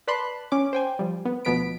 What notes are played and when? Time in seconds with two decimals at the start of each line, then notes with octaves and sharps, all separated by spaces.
0.08 B4 D5 A5 B5 C6 F#6
0.52 C#4 D6
0.73 C5 G5 G#5
0.99 F3 G3
1.25 B3
1.45 D2 B2 F3 B3 B6 D7